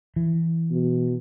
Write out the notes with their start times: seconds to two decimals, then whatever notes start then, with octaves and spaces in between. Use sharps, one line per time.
0.16 E3
0.70 B2